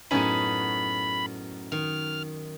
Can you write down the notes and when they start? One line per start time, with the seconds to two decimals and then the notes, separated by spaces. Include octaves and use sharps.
0.11 F#2 A2 B3 C#4 D#4 F#4 B5
1.72 D#3 F6